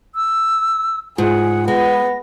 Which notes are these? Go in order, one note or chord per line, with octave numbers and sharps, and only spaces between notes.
E6
G#2 F4 G#4 F#5
G#3 B3 A#6